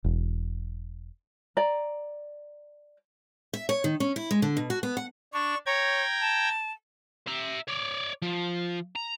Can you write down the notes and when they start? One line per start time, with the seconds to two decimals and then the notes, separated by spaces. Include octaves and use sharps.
0.04 E1
1.57 D5 A#5
3.53 E5
3.69 C#5
3.84 D#3
4.00 C#4
4.16 E4
4.31 G#3
4.42 D3
4.57 B2
4.70 F#4
4.83 B3
4.97 F#5
5.33 D4 C#6
5.66 C#5 G5 A#5 G#6
6.21 A5
7.27 E5 A#5
7.68 C#5 D5
8.22 F3
8.96 A#5